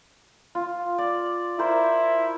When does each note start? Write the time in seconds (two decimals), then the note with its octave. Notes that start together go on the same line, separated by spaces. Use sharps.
0.55 F4
0.98 D5
1.59 E4 A#4 C5